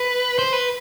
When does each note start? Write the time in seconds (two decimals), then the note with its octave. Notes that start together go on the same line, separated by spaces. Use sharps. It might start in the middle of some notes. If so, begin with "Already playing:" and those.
Already playing: B4
0.39 C5
0.53 B4